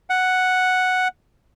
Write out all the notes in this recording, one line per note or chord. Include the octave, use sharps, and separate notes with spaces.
F#5